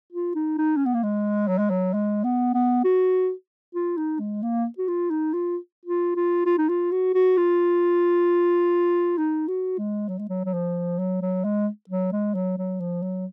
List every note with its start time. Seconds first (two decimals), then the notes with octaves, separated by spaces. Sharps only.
0.13 F4
0.35 D#4
0.58 D#4
0.77 C#4
0.86 B3
0.94 A#3
1.03 G#3
1.48 F#3
1.59 G#3
1.70 F#3
1.93 G#3
2.24 B3
2.54 B3
2.84 F#4
3.75 F4
3.97 D#4
4.20 G#3
4.43 A#3
4.79 F#4
4.88 F4
5.10 D#4
5.34 F4
5.86 F4
6.16 F4
6.46 F4
6.58 D#4
6.69 F4
6.92 F#4
7.14 F#4
7.37 F4
9.18 D#4
9.48 F#4
9.78 G#3
10.09 F#3
10.19 G#3
10.29 F#3
10.45 F#3
10.54 F3
10.99 F#3
11.22 F#3
11.44 G#3
11.90 F#3
12.12 G#3
12.35 F#3
12.58 F#3
12.80 F3
13.02 F#3